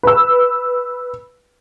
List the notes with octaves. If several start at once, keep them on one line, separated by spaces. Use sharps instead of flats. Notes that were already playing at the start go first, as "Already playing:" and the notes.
B4 E6